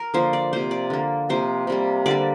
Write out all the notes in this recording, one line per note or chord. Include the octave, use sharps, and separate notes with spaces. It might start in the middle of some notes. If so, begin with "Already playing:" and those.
Already playing: A#4
D3 F3 A#3 C5
D5
C3 A#3 C5
D5
D3 A#3
C3 F3 A#3 C5
C3 G3 A#3
D3 G3 A#3 D5